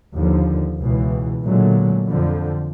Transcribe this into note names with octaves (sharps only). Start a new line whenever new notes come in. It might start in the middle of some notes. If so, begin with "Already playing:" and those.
D#2 D3 F3
C#2 B2 E3
A#2 D3 F#3 G#3 A3
F2 D3 F3